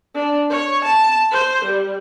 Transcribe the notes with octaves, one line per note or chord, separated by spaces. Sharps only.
D4
C#5
A5
C5
G3